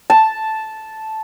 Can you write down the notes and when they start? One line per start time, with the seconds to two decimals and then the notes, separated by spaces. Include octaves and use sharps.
0.10 A5